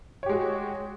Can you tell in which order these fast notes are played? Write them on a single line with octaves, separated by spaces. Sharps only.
C#5 G4 G#3 F#4